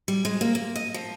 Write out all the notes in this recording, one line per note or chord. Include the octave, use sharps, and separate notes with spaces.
G3
G#3
A#3
A#3
D#5
F3